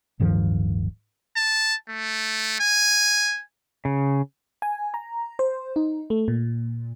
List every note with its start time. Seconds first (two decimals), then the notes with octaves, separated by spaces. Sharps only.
0.20 D1 G2 D#3 F3
1.36 A5
1.89 A3
2.60 G#5
3.85 C#3
4.62 G#5
4.94 A#5
5.39 C5
5.76 D#4
6.10 A3
6.28 A#2